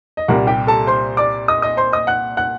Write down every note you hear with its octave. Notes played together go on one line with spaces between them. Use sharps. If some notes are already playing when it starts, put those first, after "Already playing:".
D#5
C2 A#2 G3 A#3 F#5
G4 G5
A4 A5
C5 C6
D5 D6
D#5 D#6
D#5 D#6
C5 C6
D#5 D#6
F#5 F#6
F#5 F#6